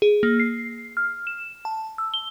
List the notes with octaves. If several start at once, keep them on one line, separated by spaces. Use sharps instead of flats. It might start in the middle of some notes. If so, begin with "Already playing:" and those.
G#4
A#3
C7
F6
E7
A5
E6
G7